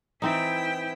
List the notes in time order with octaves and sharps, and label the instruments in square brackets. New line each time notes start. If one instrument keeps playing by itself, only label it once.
[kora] E3 C4 D#4 [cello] E4 G5